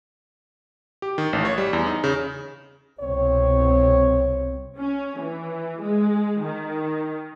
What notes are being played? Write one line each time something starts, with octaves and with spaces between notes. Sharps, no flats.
G4
D#3
A1
C#5
G3
E2
D#4
C#3
C2 B2 C4 C#5
C#4
E3
G#3
D#3